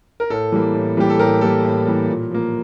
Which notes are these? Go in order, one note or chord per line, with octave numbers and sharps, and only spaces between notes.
A#4
A2 A4
E3 G3 A#3
A2
E3 G3 A#3 G4
A4
A2 G4 A#4
E3 G3 A#3 A4
A2
E3 G3 A#3
A#2
F3 A#3